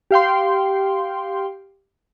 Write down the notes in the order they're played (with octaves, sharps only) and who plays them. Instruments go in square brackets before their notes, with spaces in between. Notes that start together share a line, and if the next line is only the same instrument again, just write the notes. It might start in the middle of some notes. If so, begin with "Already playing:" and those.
[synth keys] G4 F5 G5 C6